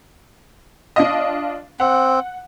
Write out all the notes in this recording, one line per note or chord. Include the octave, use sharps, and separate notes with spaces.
D4 F4 D#5
C4 F#5